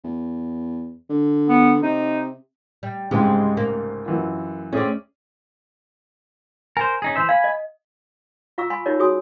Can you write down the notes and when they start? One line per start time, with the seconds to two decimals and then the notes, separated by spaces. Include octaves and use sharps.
0.04 E2
1.10 D3
1.49 B3
1.83 C3 D#4
2.83 G3
3.11 C2 G#2 C#3 G#3 G4
3.57 A#3
4.06 F#2 E3 F4
4.73 A3 C4 C#4 G#4 D5
6.77 A#4 C5 G#5
7.02 C#4 D#4 G#4
7.16 E3 C5 E5
7.29 F5 G#5 B5
7.44 D#5
8.58 F4 F5 A#5 C#6 E6
8.70 F5 G#5 B5 C6
8.86 D#4 F4 G4 A#4 C#5 D5
8.99 F#4 G#4 C#5 G#5 D#6